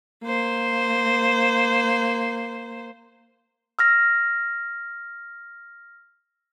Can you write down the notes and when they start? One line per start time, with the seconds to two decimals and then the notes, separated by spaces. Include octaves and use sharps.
0.24 A#3 C5
3.79 E6 F6 A#6